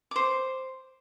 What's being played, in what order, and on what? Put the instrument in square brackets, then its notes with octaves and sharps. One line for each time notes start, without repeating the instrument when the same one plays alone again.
[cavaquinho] C5 D6